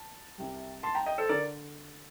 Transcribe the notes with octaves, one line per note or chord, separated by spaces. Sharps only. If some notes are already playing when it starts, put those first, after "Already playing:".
Already playing: A5
C2 C3 G3
A5 C6
G5 A#5
D#5 G5
A4 C5
D3 A#4 D5